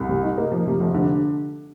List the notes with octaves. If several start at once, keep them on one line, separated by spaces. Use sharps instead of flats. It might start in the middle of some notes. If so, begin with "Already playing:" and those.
Already playing: C2
C3
D#4
A#3
F3
C3
F1
D3